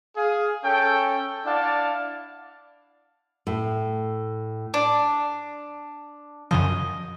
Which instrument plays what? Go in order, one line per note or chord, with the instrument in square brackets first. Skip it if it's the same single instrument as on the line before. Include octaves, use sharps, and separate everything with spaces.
[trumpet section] G#4 F5
C#4 A4 G5
D4 E4 D5 F5 F#5 A5
[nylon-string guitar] A2
[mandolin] D4
[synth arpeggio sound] F#2 C#3 F3 [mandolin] D#5